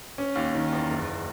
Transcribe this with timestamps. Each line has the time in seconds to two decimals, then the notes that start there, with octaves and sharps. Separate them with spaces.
0.18 C#4
0.36 D#2
0.55 D#3
0.72 E2
0.90 F#1